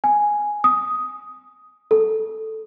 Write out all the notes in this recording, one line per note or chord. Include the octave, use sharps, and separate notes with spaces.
G#5
D#6
A4